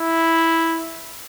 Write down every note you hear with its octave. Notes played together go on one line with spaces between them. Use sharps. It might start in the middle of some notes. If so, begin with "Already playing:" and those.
Already playing: E4